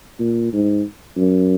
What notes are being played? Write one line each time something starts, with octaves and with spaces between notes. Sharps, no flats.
A#2
G#2
F#2